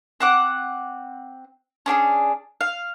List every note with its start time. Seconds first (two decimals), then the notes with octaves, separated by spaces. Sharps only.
0.20 C4 F#5 D6
1.86 C#4 D4 G4 G#4
2.61 F5